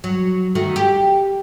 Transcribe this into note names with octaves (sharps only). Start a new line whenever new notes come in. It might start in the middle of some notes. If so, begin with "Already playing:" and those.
F#3
D#3 A3 F#4
G4